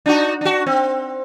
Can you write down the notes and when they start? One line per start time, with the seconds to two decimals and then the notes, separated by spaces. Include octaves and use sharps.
0.06 D4 D#4 F#4
0.41 D4 F#4
0.66 C4